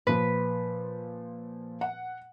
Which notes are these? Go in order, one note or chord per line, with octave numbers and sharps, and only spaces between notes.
A#2 F3 B4
F#5